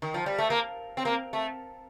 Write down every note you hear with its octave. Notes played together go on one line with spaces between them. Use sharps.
D#3
F3
G3
A3
A#3
C4
A#3
A3